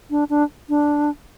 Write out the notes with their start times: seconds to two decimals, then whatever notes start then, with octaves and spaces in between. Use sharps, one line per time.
0.11 D4
0.30 D4
0.69 D4